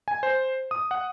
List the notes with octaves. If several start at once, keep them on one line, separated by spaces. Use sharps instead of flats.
G#5
C5
D#6
F#5